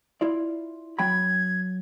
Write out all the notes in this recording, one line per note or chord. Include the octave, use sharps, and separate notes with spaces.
E4 F4 D5
F#3 G5 B5 G#6